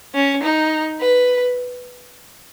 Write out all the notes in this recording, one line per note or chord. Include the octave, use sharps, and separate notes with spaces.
C#4
D#4
B4